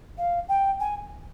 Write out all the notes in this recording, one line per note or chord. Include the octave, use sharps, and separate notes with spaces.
F5
G5
G#5